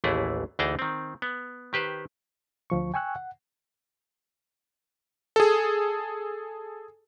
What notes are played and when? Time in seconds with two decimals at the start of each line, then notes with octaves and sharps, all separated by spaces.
0.04 A1 D#2 E3 A3 E4 G#4
0.59 D2 E3 D#4 G#4 G5 A5
0.79 D#3 C4
1.22 B3
1.73 D#3 G4 B4 C5
2.70 D2 F3 C#6
2.94 G5 G#5 C#6 E6 F#6
3.16 F#5
5.36 G#4 A4